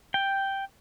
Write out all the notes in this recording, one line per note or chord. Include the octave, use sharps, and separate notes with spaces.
G5